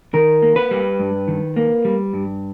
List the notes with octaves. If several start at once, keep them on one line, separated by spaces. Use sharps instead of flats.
D#3 A#4
A#3
B4
G3
G2
D#3
A#3
G3
G2